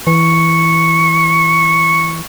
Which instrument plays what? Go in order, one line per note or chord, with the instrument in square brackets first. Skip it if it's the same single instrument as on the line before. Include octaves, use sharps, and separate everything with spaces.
[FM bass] E3 [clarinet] C#6